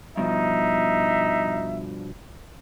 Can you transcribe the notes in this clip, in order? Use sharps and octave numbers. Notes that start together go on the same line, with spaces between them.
G2 B2 F3 D#4 E5